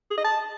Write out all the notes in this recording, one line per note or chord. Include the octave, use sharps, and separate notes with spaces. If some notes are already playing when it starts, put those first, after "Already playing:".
G#4
D#5
A5